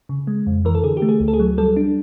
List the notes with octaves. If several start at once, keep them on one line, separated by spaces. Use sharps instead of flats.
C#3
G#3
F2
E3 A#4
A4
D3 G#4
G4
A3
G#4
D2
A4
G#4
F#3
G3 A4
D4